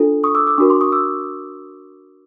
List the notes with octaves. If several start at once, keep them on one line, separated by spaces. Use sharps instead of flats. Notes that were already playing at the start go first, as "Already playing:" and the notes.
Already playing: D4 F4 A4
C#6 D#6
D6 E6
D6 E6
D4 F#4 A#4 C#6 D#6
C6 D6
C#6 D#6
D6 E6